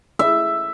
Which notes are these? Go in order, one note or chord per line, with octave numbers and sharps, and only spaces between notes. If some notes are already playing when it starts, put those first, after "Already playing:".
E5